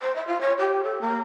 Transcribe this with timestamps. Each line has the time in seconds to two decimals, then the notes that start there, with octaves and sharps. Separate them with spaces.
0.01 C5
0.15 E5
0.27 F4
0.41 C#5
0.59 G4
0.83 A4
1.01 A#3